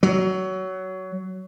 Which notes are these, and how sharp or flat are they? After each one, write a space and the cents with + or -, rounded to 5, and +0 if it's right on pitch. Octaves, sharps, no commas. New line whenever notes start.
F#3 +20